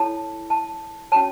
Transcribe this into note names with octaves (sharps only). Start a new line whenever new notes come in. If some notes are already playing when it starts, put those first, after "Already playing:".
Already playing: E4 A4 C#5 A5
A5
C#4 F#4 C#5 A5